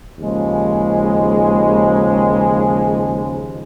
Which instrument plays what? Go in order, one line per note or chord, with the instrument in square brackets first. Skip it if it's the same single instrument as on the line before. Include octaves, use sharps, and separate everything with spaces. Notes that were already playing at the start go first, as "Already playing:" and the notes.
[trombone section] D#2 C#3 F3 G#3